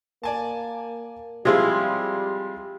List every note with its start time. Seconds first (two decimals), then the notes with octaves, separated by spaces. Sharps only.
0.23 A#3 D5 G#5 A5
1.45 C3 F3 G3 G#3 E4 F4 G#4